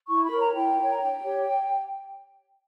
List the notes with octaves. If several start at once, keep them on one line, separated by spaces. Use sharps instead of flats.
E4 C#6
B5
A#4 C#5
A#5
E4 G5
A#4 C#5
A#5
D4 G5
G4 C#5